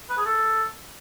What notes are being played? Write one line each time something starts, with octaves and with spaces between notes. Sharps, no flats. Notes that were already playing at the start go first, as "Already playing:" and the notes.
B4
G#4
A4